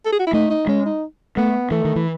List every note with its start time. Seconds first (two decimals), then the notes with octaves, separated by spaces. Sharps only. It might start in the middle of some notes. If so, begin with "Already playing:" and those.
0.06 A4
0.12 G#4
0.19 F#4
0.27 E4
0.33 A3 D#4
0.50 D#4
0.67 G#3 C#4
0.86 D#4
1.37 A3 B3
1.71 E3 A3
1.85 D#3
1.96 E3